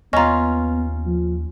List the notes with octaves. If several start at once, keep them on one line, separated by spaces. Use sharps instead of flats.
D#2 B3 C#4 F4 D#5 A#5
F3